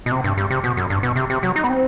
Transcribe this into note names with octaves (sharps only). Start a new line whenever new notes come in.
B2
C3
G2
G2
C3
B2
F#2
G2
B2
C3
C3
F#3
D#4
B3
C4